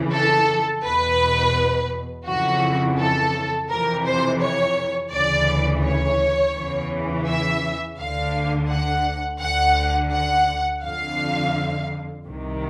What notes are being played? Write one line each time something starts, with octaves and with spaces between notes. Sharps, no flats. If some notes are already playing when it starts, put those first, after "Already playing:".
Already playing: F2 C#3 E3
A4
E2 B2 B4
F2 C#3 E3 F#4
A4
F2 C3 E3 A#4
C5
C#5
D2 C#3 E3 D5
C#5
E2 C#3 E3
E5
D2 D3 F5
F#5
D2 D3 F#5
F#5
F2 D3 F5
C2 C3 D#3